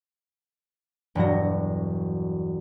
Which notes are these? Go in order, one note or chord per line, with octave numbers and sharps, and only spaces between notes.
E1 G2 F#3 A#6